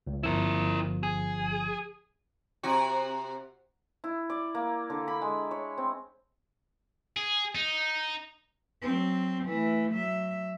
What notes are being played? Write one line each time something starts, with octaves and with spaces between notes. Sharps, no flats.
C#2
G1 F3 E4 A#4
G#4
C3 F#4
E4
D5
A#3
D3
B5
G#3
C#5
C4
G#4
D#4
F#3 C4
E3 A3
F#3 E5